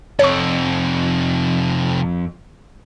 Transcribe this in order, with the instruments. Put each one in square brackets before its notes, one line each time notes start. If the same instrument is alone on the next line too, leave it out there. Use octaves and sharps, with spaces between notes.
[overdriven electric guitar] F2 [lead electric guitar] C3 A4 [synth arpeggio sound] C#5 C#6